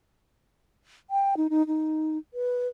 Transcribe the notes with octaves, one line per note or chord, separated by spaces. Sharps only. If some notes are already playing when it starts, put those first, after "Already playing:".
G5
D#4
D#4
D#4
B4